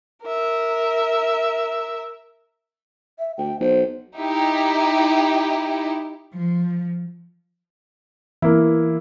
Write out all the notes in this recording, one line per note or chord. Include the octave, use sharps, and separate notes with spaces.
A#4 E5
E5
D2 G5
B1 C5
D#4 E4 G4
F3
E3 A#3 E4